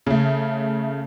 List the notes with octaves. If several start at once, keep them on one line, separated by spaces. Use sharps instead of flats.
C#3 A3